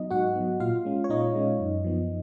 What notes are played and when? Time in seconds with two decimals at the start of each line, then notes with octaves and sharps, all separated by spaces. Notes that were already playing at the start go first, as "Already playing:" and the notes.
Already playing: F#3 B3 D#4 D#5
0.10 G#2 F#4 F#5
0.36 F#3 B3
0.60 A#2 F4 F5
0.85 G#3 C#4
1.04 C#5
1.09 A#2 D#4 D#5
1.35 G#3 C#4
1.60 F#2
1.84 F3 B3